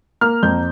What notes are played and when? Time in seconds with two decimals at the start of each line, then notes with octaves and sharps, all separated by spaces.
0.21 A#3 F6
0.43 F2 G6